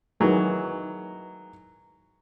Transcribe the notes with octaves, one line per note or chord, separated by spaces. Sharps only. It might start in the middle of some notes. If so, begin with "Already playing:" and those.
D#3 E3 F#3 G#3